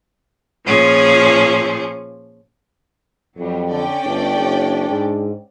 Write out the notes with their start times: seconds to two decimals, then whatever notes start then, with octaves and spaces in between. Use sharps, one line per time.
0.64 A#2 F3 C#4 G#4
3.37 F2 F#3 G3
3.71 D3 C#4 D5 G5
4.05 G1 D4
4.38 F#1
4.90 G#2